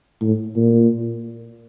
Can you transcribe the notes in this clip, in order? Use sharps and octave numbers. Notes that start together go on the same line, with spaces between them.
A2
A#2